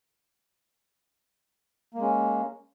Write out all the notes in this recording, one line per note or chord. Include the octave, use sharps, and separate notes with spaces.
G#3 A#3 C#4